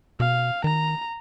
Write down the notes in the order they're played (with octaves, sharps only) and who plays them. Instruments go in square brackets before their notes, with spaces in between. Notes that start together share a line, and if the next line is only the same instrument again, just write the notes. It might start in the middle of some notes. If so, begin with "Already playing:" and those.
[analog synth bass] B2 [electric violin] F5
[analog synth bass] D#3 [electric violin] A#5